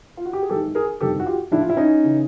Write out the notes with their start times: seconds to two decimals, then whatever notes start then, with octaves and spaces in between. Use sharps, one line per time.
0.17 F4
0.26 F#4
0.33 G4
0.43 G#4
0.50 G#1 G#2 E3 G4 A4
0.75 G#4 A#4
1.00 G1 F2 C3 D#3 G4 A4
1.20 F#4
1.26 F4 G4
1.52 A#1 A2 E3 D4 E4
1.61 F4
1.70 E4
1.77 C#4 D#4
2.04 C#3 E3